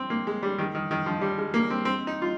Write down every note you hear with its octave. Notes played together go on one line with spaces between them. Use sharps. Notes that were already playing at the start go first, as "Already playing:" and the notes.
Already playing: C4
A#3
G#3
G3
D#3
D#3
D#3
F3
G3
G#3
A#3
C4
C4
D#4
F4